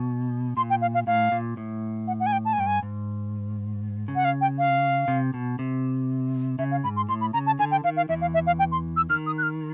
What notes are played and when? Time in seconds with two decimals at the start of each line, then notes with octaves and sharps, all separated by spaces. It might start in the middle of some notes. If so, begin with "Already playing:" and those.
Already playing: B2
0.57 A#2 C6
0.70 G5
0.82 F5
0.94 F5
1.07 A2 F5
1.32 A#2
1.57 A2
2.08 F#5
2.20 F#5
2.26 G#5
2.33 G5
2.45 A5
2.53 G#5
2.58 G2 G5
2.67 G#5
2.83 G#2
4.08 C#3
4.16 F#5
4.25 F5
4.41 G5
4.58 F5
5.08 C3
5.34 B2
5.59 C3
6.59 C#3 E5
6.71 F5
6.84 G#2 B5
6.96 C6
7.09 A2 C6
7.21 B5
7.33 C#3 A#5
7.46 A5
7.59 D3 G#5
7.71 G5
7.84 D#3 F5
7.97 F5
8.09 E2 E3 E5
8.21 F5
8.34 E5
8.47 F5
8.59 G5
8.72 C6
8.97 E6
9.10 D#3 F6
9.26 D#6
9.38 F#6
9.43 F6